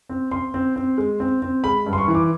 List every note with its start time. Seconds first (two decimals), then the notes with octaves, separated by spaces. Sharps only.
0.09 C4
0.31 C4 C6
0.54 C4
0.76 C4
0.98 G#3
1.20 C4
1.42 C4
1.64 G#3 B5
1.86 G2
1.93 C6
1.98 C#6
2.08 E3
2.15 D6